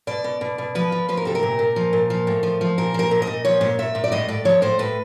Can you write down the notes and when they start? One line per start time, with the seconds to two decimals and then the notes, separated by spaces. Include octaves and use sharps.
0.07 B2 D5
0.24 B2
0.41 B2
0.58 B2
0.75 F3 B4
0.92 F3
1.09 F3 B4
1.17 A#4
1.25 C3 A4
1.35 A#4
1.43 A#2
1.59 A#2
1.76 F3
1.93 A#2
2.10 F3
2.27 A2
2.43 F3
2.61 F3
2.78 A#2 A#4
2.94 F3 A#4
3.11 A#2
3.22 D#5
3.27 A#2
3.45 F3 C#5
3.61 A#2
3.79 A#2 E5
3.95 A#2
4.04 D5
4.12 A2 D#5
4.28 A2 D5
4.45 F3 C#5
4.62 A2 C5
4.79 A2 B4